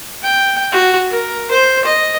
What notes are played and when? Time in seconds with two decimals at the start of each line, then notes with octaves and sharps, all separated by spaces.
0.23 G5
0.72 F#4
1.09 A#4
1.51 C5
1.85 D#5